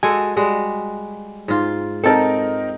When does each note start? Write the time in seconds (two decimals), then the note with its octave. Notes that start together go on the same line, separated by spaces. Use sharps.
0.03 G#3 F#4 A4 G#5
0.36 G3 G#3 F#4
1.48 G#2 F4
2.04 C4 D#4 A4 A#4 A5